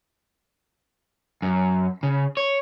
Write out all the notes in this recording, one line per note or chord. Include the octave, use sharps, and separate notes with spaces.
F#2
C#3
C#5